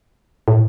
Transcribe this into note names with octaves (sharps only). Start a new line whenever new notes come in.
A2